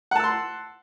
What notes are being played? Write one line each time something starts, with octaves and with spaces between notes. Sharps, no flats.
F#5 A5 C6 E6